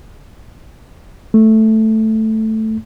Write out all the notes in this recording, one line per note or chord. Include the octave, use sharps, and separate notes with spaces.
A3